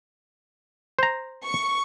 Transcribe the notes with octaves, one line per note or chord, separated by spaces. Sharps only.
C5 A#5
C#6